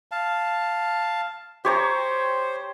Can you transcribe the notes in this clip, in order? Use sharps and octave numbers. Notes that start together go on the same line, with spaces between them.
F5 A5
G4 C5 C#5 A#5